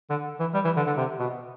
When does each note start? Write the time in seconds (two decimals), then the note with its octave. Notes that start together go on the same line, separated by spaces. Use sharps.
0.10 D3
0.40 E3
0.54 G3
0.64 E3
0.76 D3
0.87 D3
0.97 C3
1.19 B2